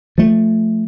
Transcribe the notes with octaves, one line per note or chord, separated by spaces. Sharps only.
F3 A3